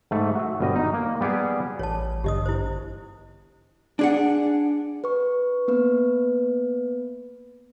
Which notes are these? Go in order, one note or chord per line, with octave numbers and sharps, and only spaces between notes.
G#2 A3
F#4 E5
G1 B2 G3 D#5
D#4
A#3
G3 B3 G4 G#4
A1 C#5 A5
G1 G2 D3 G4 D#5 D#6
E4 C5
D4 G#4 F#5
B4 C#6
A#3 B3 B4